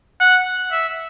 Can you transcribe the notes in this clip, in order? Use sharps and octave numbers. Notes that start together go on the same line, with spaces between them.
F#5
E5